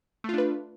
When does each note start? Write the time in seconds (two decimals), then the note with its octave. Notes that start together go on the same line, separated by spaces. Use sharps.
0.24 A3
0.29 F4
0.33 D4
0.38 B4